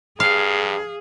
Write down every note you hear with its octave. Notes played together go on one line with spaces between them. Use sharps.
G2 G#4 F5